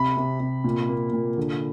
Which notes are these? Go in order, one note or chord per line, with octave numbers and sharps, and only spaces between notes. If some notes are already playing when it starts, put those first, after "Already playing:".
Already playing: C3 B5
C3
C3
A#2
A#3
A#2
D3